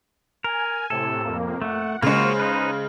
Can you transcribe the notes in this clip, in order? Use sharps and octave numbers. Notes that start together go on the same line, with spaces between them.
A#4 G#5
A2 C3 A4
F2 A#3
A3 F#5
C#3 G#3 A#3 F4 F#4 C5
D#4 B4